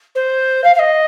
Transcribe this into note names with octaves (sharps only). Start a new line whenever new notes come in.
C5
F5
F5
D#5